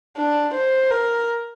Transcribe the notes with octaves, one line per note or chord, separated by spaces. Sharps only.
D4
C5
A#4